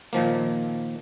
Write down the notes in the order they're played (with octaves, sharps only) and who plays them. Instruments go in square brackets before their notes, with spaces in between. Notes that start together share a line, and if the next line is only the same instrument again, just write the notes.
[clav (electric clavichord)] A#2 D#3 F3 A#3